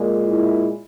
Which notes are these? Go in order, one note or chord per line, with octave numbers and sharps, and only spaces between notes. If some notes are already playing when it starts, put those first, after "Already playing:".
Already playing: A#2 G#3
E4